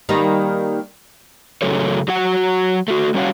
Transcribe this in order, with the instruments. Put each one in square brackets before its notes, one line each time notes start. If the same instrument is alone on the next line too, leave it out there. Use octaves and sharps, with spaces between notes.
[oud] D#3 G3 A#3
[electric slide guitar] F#2 A2 C#3 F#3 A4 C#5
F#3 F#4 F#5
A3 F#4
G3 C#4 F#4 C#5 F5 F#5